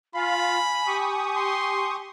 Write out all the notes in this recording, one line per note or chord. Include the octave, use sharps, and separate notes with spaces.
F4 F5 G#5 B5
G4 C#6 D#6
C6